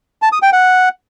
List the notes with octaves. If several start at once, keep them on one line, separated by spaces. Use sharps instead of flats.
A5
D#6
G5
F#5